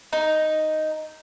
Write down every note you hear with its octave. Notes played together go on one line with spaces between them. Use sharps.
D#4